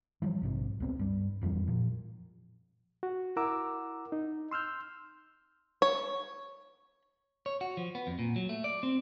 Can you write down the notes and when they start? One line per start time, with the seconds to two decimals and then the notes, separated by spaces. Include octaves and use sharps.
0.22 E3 F3 G3
0.42 A#1 G#2 C3
0.80 C#2 B3 C4
0.99 G2 G3
1.41 F1 F2 E3 G3
1.68 A#2 F3
3.03 F#4
3.37 E4 A#4 F#5 A#5 D6 E6
4.12 D#4
4.51 C6 E6 F6 G6
5.82 C#5
7.46 C#5
7.61 F#4
7.77 F3
7.95 B3
8.07 F2
8.19 A#2
8.36 F#3
8.49 A3
8.64 D5
8.83 C4